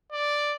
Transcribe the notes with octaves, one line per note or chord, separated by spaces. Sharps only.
D5